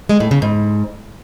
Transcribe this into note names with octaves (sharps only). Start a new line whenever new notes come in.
G#3
A2
C#3
G#2